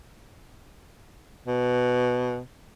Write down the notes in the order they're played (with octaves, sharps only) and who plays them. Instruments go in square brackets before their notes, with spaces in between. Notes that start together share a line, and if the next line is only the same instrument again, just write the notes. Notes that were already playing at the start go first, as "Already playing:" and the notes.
[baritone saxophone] B2